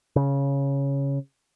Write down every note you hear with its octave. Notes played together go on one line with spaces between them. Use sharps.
C#3